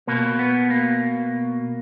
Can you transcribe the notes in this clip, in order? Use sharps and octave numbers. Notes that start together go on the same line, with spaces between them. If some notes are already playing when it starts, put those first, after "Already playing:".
B2 A#3
B3
A#3